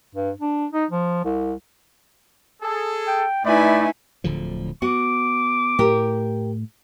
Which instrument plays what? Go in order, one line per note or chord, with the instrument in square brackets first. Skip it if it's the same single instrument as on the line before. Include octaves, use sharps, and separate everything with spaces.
[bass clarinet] G2
D4
D#4
F3
C2
[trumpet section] G#4 A4
[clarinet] G5
[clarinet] A3 [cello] D#4 E4 [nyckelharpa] B4 G#5 [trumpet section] D5 B5
[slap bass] D1 D3 F3
[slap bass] B3 [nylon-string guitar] F#4 [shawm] D6
[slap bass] A2 [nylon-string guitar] G4 A#4